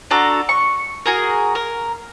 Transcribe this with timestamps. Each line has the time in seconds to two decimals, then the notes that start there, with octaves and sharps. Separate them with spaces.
0.11 D4 F#4 A4 A#5
0.49 C#6
1.06 F#4 G#4 A#4
1.55 A#4